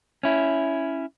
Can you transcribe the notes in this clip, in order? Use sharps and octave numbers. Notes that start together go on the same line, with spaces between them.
C#4 E4